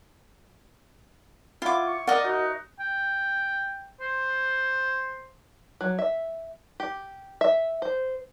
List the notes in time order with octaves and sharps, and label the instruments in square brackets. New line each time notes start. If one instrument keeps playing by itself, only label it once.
[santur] E4 [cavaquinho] F4 D6 [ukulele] F#5
[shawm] C#6
[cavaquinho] A#4 D#5 [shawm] D5 [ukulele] F#5
[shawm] D#4 [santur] F#4
[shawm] G5
C5
[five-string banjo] F#3
E5
G4
E5
C5